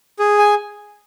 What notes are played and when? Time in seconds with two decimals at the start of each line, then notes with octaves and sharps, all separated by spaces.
0.19 G#4
0.38 G#5